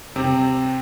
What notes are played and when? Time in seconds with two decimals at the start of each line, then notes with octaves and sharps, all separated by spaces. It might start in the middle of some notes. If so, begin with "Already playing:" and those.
0.16 C3 C4